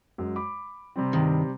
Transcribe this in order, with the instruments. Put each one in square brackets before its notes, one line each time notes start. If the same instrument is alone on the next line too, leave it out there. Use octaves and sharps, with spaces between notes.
[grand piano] F#2 G#3
B5 D6
C3 G3 C4
[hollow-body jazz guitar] G2 D#3